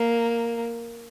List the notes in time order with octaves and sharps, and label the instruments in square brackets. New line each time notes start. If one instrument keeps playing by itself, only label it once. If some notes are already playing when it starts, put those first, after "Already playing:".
Already playing: [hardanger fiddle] A#3